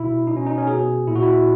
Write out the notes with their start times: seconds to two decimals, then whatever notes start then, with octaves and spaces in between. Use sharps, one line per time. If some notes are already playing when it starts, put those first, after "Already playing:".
Already playing: B2 E4
0.27 B2 D#4
0.37 C#4
0.47 D#4
0.58 C#4
0.67 B2 G#4
1.07 A#2 E4
1.15 F#4
1.23 E4